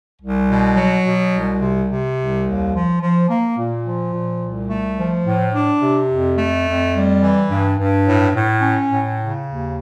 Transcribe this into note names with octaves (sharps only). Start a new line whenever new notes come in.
C2
B2
F#3
B2
C2
C3
C3
C2
D#2
F3
F3
A#3
A#2
F3
A#2
C2
A3
F3
A2
D4
C3
F2
A3
F2
G3
E3
G2
G2
A2
A2
C#4
A2
C#3
D#2